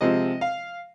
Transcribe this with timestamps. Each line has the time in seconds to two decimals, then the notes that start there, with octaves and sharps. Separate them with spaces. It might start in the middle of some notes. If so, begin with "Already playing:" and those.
0.01 C3 F3 G#3 C4 D#5
0.41 F5